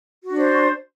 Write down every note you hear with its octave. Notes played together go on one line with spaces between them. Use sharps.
D4 F#4 C5 D5